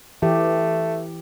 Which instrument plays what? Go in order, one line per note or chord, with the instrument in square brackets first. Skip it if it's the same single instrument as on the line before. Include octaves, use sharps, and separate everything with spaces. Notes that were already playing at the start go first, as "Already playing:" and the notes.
[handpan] E3 G4 [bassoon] A3